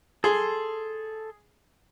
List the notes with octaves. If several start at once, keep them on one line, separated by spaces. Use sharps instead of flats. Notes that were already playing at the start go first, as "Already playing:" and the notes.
G#4 A4 C6